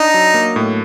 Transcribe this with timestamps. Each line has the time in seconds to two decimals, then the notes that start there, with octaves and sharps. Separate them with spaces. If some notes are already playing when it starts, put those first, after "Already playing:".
Already playing: D4 D#4
0.14 F#3
0.34 A#3
0.56 A2